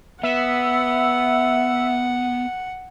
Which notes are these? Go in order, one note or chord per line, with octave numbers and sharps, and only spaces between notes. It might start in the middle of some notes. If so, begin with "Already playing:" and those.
B3 E5 F#5